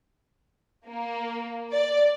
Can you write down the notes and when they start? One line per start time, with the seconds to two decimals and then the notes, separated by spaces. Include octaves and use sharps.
0.88 A#3
1.72 D5